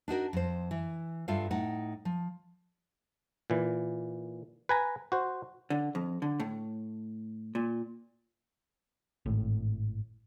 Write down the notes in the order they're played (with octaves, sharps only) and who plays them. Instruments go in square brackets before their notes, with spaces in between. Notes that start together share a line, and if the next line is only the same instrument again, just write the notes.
[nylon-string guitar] D4 D#4 F#4 A#4
F2 C5
E3
G2 F4 A4 E5 F5
A2 D#4 F#5
F3
[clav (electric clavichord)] A#2 E3
B4 G#5 A#5
F#4 C5
[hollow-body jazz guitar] D3
F2
D3
A2
A#2
[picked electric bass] G#1 A2